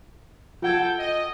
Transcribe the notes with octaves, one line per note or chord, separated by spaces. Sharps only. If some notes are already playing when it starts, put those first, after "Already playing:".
F4 A4 F#5 G5 G#6
D#5